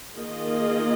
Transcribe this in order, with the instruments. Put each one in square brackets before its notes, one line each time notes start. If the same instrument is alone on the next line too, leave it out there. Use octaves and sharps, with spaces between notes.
[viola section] D#3 A#3 F4 G#4 D#5